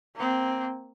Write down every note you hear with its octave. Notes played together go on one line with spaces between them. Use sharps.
A#3 C4